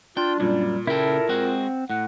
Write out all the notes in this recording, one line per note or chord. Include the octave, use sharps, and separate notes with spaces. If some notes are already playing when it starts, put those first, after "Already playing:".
D4 F4 G5
F#2 A#2 G3
C#3 E4 A4 A#4 G5
G#3 C4 F#4 F#5
A2 F#5